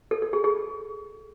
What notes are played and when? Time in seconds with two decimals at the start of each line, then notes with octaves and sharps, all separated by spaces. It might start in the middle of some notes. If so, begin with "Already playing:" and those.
0.11 A4
0.22 A4
0.33 G#4
0.44 G#4